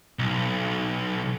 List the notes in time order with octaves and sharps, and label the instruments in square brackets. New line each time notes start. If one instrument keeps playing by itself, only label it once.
[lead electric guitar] B1